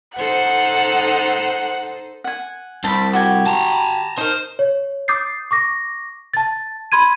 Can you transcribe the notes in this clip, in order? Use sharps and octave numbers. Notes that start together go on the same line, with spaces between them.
D#4 A4 C5 F#5
F#5 G#5
C2 A5 B5
F#4 G4 G#5
A5 A#5
D#4 A#4 C5
C#5
D6 D#6 G6 A6 C7
C#6 D6 A#6
A5 A6
B5 C6 G#6 D#7